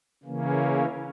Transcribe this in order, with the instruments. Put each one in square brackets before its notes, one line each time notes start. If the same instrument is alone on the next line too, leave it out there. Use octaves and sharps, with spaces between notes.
[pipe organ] C#3 E3 A#3 C#4